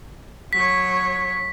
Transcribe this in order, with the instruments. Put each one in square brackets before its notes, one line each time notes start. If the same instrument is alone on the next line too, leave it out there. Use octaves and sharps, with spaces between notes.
[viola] F#3 C#5 [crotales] B6